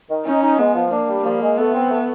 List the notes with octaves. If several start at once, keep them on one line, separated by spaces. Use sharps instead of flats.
D#3
C#4 D#4
D#4
G#3 B3
F3
A#3 D4
G3
F3 A#3
G#3
A3 B3
C4
A3